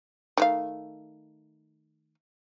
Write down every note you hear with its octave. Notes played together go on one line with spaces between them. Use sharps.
D#3 A3 F5